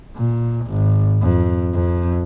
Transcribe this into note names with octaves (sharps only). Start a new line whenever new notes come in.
A#2
G#1
F2
F2